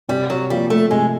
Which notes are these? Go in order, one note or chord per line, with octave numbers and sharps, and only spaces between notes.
C3 G3
F#3
F3 G3 A#3
A3
C3 G#3